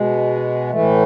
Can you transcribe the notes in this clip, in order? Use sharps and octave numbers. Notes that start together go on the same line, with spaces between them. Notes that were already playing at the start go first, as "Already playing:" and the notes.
Already playing: B2 G#3
A2 E3 A3